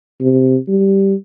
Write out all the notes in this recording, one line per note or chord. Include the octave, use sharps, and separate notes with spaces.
C3
G3